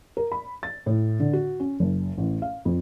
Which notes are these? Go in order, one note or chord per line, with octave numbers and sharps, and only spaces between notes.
A#4
B5
A6
A2
D3
F#4
C#4
F#1
A1
F5
F2